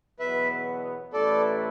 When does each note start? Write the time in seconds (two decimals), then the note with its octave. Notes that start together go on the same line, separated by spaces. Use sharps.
0.19 E2 B2 F#3 B3 B4 E5
1.13 A1 A2 A3 E4 A4 B4 D5